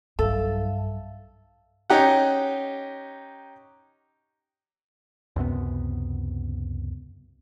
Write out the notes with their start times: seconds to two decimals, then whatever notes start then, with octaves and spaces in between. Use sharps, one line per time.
0.19 B1 G2 A4 E5 F5
1.90 C#4 D#4 G4 F#5
5.36 C#2 F#2 C3 B3